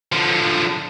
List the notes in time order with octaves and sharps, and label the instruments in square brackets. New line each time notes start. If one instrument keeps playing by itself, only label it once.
[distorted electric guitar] D3 F3